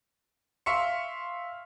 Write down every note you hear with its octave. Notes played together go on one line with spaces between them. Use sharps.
E5 F5 C6 C#6 C#7